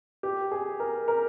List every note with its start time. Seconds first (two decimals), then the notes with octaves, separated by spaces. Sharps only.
0.23 G4
0.52 G#4
0.80 A#4
1.08 A#4